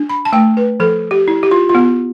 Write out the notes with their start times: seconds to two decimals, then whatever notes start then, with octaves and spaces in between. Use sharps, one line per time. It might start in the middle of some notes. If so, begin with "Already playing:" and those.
Already playing: D4
0.09 B5
0.25 A5
0.32 A3 G5
0.57 B4
0.80 F3 A4
1.11 G4
1.28 E4
1.43 G4
1.51 F4
1.69 F4
1.75 B3